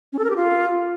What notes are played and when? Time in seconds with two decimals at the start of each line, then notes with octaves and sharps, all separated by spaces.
0.13 C#4
0.19 A4
0.24 A#4
0.30 G4
0.36 F4